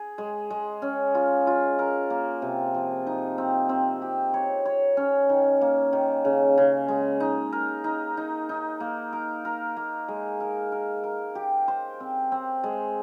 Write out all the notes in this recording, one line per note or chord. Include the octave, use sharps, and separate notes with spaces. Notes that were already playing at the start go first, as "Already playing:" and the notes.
Already playing: G#4
G#3
G#3
C#4
F4
F4
A#4
A#3
C3
F3
D#4
C4
C4
G4
C#5
C#5
C#4
D#3
A#3
D#3
C#3
C#3
G#3
D#4
A#4
D#4
D#4
D#4
A#3
A#4
A#4
A#3
G#3
A#4
A#4
A#4
G4
C5
C4
C4
G#3